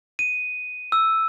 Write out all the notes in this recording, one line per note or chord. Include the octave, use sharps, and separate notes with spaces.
D#7
E6